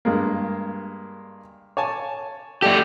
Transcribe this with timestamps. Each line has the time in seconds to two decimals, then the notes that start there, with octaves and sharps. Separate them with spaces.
0.05 G2 G#3 A#3
1.77 C#5 G#5 A5
2.62 A3 G4 A4 D5